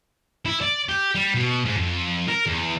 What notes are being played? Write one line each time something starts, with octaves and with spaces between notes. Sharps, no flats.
E4
D5
G4
G3
B2
G#2
F2
A#4
E2